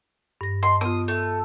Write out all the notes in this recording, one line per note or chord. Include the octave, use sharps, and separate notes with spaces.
G2 A#6
D#5 C6
B3 F4 D#6
A3